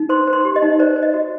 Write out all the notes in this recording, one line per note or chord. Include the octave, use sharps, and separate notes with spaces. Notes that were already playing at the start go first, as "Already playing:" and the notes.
Already playing: D#4
C5 C6
C5
C6
G4
D#5
D#4
C5 D5
C5
D#5
F#4